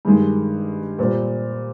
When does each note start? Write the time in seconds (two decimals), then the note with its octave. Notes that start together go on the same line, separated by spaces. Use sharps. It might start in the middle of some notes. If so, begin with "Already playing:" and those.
0.05 G2 D#3 G#3
0.98 A#2 G3 C4